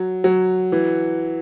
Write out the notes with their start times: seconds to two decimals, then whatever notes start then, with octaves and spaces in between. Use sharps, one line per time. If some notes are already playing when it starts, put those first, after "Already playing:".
Already playing: F#3
0.24 F#3
0.72 E3